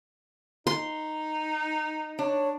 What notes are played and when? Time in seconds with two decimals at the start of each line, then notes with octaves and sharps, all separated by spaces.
0.67 D#4 C6
2.19 D4 C#5